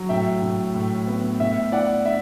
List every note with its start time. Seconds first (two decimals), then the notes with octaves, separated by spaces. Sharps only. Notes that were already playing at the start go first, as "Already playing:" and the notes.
Already playing: F#3
0.09 A2 E5 G5
0.42 A2
0.74 A2
1.07 B3
1.40 A2 E5
1.72 E4 D5 F#5
2.05 E4 E5